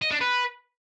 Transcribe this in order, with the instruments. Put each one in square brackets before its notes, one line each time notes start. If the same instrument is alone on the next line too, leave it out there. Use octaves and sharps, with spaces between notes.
[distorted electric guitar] D#5
D4
B4